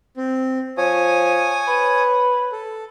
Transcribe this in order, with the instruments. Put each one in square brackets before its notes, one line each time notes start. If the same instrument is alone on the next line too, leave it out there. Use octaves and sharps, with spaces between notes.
[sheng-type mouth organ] C4
[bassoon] F3 [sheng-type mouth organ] C#5 G#5 D#6
[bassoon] B4
[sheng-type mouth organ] A4